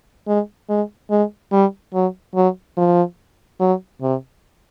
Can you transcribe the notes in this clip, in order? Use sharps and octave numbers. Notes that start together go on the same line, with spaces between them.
G#3
G#3
G#3
G3
F#3
F#3
F3
F#3
C3